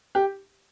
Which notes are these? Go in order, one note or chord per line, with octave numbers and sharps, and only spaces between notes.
G4